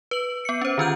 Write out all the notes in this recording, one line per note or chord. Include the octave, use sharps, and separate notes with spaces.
B4 F#7
B3 C#7
C#4 C5
D3 D#3 C#4 F4 F6 G6